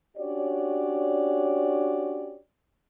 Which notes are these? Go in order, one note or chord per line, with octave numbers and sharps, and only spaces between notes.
C#4 D4 F#4 G4 C#5 D5